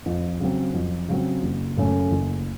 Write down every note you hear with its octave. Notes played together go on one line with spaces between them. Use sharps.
F2
C#3 F#3 C4
F2
C#3 F#3 C4
F#1
F#2 C#3 A3 C#4
F#1